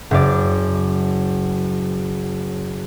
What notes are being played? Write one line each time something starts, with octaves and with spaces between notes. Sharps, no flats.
F#1 D5